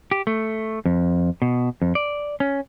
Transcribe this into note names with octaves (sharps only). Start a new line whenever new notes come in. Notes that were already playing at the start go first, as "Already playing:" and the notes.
G4
A3
F2
B2
F2
D5
C#4